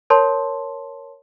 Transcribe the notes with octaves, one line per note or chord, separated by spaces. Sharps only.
A#4 C#5 A5 C6